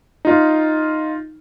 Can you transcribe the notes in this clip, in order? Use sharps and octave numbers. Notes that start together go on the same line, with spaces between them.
D#4 F4